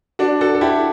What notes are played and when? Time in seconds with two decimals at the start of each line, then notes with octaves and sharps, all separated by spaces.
0.19 D4 F#4
0.41 F#4 A4
0.55 A4
0.61 E4 G4